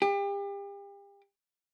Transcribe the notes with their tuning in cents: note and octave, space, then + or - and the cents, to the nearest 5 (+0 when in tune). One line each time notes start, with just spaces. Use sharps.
G4 +35